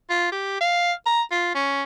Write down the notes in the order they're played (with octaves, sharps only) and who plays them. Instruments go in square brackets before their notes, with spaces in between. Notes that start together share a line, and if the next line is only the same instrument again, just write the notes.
[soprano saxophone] F4
G4
F5
A#5
F4
C#4